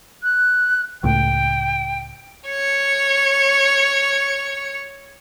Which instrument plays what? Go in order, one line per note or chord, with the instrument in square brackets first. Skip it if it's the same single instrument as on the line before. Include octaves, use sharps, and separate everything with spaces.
[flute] F#6
[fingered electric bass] C#2 A2 [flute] G5
[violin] C#5 C#7